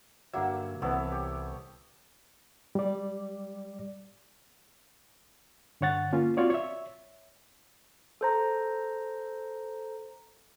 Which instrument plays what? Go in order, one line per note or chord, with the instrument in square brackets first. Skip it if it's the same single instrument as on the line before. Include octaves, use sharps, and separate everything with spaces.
[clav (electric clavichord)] G2 D3 E5 [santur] F#3 A#3
[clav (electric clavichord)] C2 E3 [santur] B3 A4 C#5
[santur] G4 C#5
[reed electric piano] G3 D5
G2 D3 C#5 F#5 A6
A#3 C#4 F4
C4 F4 F#4 C#5 D5
C#5 E5
[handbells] A4 C5 A#5